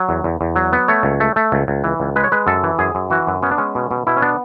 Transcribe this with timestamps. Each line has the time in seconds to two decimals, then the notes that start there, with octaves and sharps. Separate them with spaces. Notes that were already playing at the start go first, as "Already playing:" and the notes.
Already playing: F#3
0.09 E2
0.24 E2
0.41 E2
0.56 F#3
0.73 B3
0.88 A3 C#5
1.03 C#2
1.20 A3
1.36 A3
1.52 C#2
1.68 C#2
1.84 E3
2.00 C#2
2.16 G#3 B4
2.24 C#5
2.32 G#3 B4
2.47 F#2 A4
2.63 E3
2.79 F#2 G#4
2.95 F#2
3.10 E3 F#4
3.27 F#2
3.42 B3 C#4
3.51 D4
3.58 G#3 C#4
3.75 B2
3.91 B2
4.07 B2 E4
4.17 C#4
4.22 B3 D4